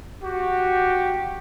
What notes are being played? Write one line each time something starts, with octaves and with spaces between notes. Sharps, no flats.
F#4 G4